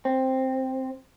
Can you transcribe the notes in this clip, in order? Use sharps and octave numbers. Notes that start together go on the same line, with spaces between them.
C4